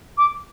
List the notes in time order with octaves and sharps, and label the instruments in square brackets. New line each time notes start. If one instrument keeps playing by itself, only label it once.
[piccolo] D6